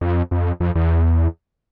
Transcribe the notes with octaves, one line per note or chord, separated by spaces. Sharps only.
F2
F2
F2
E2